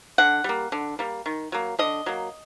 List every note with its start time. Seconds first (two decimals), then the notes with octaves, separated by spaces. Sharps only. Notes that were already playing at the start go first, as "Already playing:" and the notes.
0.18 D3 F#5
0.44 G3 A#3
0.72 D3
0.99 G3 A#3
1.26 D#3
1.52 F#3 A#3
1.79 D3 D#5
2.06 F#3 A#3